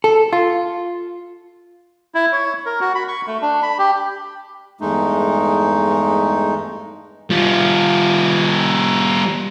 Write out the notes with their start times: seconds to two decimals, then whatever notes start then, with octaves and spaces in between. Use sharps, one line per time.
0.04 A4
0.33 F4
2.15 E4
2.32 C#5
2.66 A#4
2.80 F#4
2.95 B5
3.08 C#6
3.27 A3
3.42 D4
3.63 B5
3.78 G4
4.81 E2 G2 G#3 A3 D#4
7.30 G3 F4